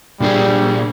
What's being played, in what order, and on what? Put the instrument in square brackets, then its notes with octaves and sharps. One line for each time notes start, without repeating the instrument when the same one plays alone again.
[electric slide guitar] A#2 D4 G#4 [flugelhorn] G3